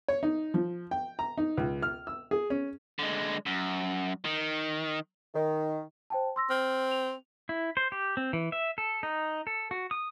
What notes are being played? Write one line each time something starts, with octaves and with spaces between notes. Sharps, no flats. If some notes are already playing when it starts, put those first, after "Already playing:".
C#5
D#4
F3
G5
A#5
D#4
C#2
F6
E6
G#4
C#4
D3 G#3
F#2
D#3
D#3
C5 G5 A5
C6 E6 A#6
C4 F6
F7
E4
C5
G4
C4
E3
E5
A4
D#4
A4
F#4
D#6